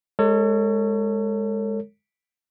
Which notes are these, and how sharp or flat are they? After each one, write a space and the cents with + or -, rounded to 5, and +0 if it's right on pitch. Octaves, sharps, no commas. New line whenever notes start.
G#3 +0 A4 +40 C#5 +0